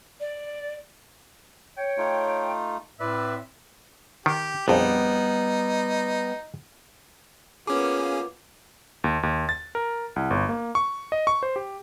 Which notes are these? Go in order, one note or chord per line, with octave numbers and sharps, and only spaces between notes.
D5
C#5 G5
A3 D#4 F4
A2 C4 B4 D5 E5
D#3 G4
A#1 F2 G3 B3 D#4
A#3 B3 C#4 F4 G#4 D6
D#2
D#2
A6
A#4
C2
G1
A#3
C#6
D#5
C#6
C5
G4